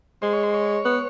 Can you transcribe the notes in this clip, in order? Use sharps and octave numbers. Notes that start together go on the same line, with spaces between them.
G#3 C5
C#5
C5
C#5
B3